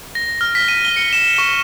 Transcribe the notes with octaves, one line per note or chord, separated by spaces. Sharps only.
A#6
F6
B6
D#7
G7
C#7
E7
C#6